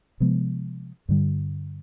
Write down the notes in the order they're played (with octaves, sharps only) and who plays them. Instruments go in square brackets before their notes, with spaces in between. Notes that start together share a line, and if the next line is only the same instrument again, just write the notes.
[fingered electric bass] C3 F3 G#3 B3
G2 D3 G3